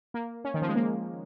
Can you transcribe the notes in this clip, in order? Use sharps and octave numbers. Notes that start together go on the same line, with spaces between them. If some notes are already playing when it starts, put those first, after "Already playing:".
A#3
C#4
D#3
F3
G#3
A#3